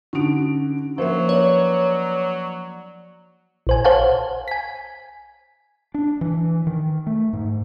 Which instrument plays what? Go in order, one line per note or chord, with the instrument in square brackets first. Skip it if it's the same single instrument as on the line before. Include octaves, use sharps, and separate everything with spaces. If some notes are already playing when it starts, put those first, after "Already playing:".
[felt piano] D3 F#4 D7 [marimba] C#4 D#4
[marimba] F3 A#3 E5 [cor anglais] F#3 [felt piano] A#4 C5
[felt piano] B4 D5 [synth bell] C#5
[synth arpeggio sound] A#1 C5 G#5
C5 C#5 F5 F#5 G#5 A5
G#5 B6
[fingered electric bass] D4
E3
D#3
A3
G#2